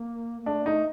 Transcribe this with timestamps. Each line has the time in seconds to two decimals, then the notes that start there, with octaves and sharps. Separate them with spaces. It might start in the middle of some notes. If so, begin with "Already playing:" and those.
Already playing: A#3
0.42 A#3
0.46 A3 D4
0.62 A#3
0.66 A3 D#4